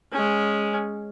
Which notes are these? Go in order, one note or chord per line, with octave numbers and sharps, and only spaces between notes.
G#3 C#4